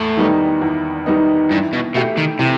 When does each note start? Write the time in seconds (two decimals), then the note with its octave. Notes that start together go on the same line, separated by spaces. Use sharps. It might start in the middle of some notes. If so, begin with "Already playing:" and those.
Already playing: E2 A2
0.17 D#3 G3 B3 D#4
0.61 E2
1.06 D#3 G3 B3 D#4
1.50 G2 E3
1.73 B2
1.94 B2 A3 E4 G4
2.17 D#3
2.39 C3 E3